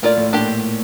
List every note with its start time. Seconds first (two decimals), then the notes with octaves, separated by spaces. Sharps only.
0.02 A2 A#3 F4 A#4 D5
0.17 A2
0.33 A#2 D4 G4